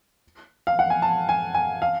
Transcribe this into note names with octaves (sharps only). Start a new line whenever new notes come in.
F5
F#5
G#5
A5
G#5
G#5
F5